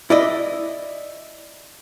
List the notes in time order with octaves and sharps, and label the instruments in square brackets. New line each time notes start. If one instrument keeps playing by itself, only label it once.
[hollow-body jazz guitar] E4 D5 D#5